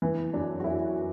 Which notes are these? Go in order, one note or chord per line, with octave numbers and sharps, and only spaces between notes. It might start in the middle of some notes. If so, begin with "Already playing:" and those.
E3
F#2 D4
F#4
F#2 E4